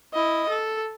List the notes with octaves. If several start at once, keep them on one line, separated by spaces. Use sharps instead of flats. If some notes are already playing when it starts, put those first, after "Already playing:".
E4 D#5
A4